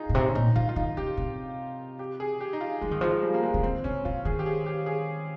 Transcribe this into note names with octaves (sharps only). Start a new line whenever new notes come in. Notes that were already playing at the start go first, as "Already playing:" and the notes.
Already playing: D#4 F4 G#4
A#2
C3 D#4
C#4
A#2 D#4
D#3 F4
F4
D#3 D#4
C#3 G4
C3
G4
G#4
G4
D#4
F4
F3 G#3
D#3
F3 G#3
G3
A#3
G#3
C#3
D#3 C4
C#3 C#4
C3 F4
D#3 G#4
G4
G#4
G4
G#4